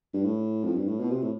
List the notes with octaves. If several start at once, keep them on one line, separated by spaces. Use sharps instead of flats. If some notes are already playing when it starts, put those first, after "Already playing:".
G2
A2
F2
G2
A2
B2
C3
A2